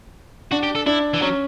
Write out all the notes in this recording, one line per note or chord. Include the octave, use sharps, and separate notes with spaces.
D4 F#4
G4
A4
D4 E4
E3
F#3 C#4